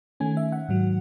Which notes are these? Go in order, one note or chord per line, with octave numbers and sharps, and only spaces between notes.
D#3 A3 C#4 G#5
E5
F#5
G#2 D#3 F#3